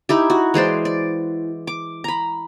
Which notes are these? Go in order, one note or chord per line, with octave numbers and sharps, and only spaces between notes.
D#4 E4 G4
F#4
E3 G#3 C5 D5
D5
D6
A#5 B5